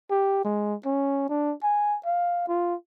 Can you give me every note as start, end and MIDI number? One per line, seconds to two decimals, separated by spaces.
0.10 0.42 67
0.45 0.75 56
0.86 1.24 61
1.29 1.53 62
1.63 1.97 80
2.06 2.47 77
2.48 2.75 65